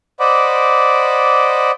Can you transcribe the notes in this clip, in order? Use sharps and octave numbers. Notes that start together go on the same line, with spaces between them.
C5 D5 D#5 F#5 B5 D6